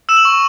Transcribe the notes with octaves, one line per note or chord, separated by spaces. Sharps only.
E6 E7
F#7
C#6